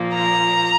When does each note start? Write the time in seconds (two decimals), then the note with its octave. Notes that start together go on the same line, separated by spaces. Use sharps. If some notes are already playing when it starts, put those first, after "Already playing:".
Already playing: A#2 F3 A#3
0.14 A#5